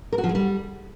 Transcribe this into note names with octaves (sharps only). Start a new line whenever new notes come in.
A#4
F#4
F3
G#3
G3